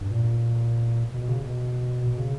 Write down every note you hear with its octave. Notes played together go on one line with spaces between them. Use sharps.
G2
A#2
B2
C#3
B2
B2
C#3